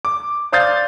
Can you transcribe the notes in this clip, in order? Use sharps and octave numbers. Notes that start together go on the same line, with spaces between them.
D6
C5 D5 F5 D#6 G6 A6